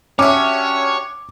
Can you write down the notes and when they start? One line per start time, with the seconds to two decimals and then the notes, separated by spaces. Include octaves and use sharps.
0.19 C#4 D4 F#4 G4 C#5 E5 D6